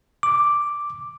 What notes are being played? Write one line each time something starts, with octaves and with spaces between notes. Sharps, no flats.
D6